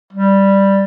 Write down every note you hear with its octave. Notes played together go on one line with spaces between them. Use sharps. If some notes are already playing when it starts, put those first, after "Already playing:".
G3